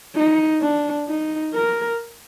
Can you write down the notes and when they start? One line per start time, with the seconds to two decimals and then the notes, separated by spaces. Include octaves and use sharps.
0.16 D#4
0.61 D4
1.08 D#4
1.54 A#4